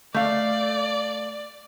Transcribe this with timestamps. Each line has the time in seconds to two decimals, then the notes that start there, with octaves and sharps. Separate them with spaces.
0.14 A3 D5 F5